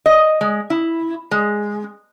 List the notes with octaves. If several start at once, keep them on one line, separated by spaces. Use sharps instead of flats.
D#5
G#3
E4
G#3